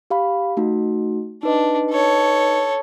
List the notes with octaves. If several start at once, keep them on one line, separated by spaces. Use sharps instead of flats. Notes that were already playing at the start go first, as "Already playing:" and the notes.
G4 F5 B5
A3 D#4 F#4
D4 D#4 B4 D#5
A4 C#5